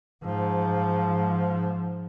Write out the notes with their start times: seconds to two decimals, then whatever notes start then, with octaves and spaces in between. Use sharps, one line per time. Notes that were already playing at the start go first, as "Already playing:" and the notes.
0.25 G#2 F3